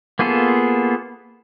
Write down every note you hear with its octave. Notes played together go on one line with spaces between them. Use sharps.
A#3 B3 F4 G#4 A4